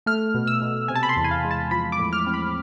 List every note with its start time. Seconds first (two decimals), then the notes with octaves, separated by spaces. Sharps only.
0.06 A3 F6
0.34 B2
0.47 E6
0.62 B2
0.88 C3 G#5
0.95 A5
1.03 B5
1.09 C6
1.16 E2
1.24 G#5
1.31 F5
1.45 G#3
1.51 A5
1.71 F3 B5
1.92 D6
1.99 A2
2.13 F6
2.27 C4
2.34 B5